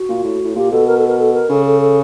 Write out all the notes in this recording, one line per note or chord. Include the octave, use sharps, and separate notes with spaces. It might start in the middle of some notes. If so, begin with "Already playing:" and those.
Already playing: F#4
A#2
A2
A2
A#2 G4
B2 A4
A#4
A4
A#4
A4
A#4
C#3 A4
A4
A4